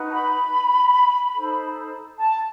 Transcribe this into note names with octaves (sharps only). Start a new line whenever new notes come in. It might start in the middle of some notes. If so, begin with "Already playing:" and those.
Already playing: D#4 F#4 B4
A5
B5
D#4 A4 C5
A5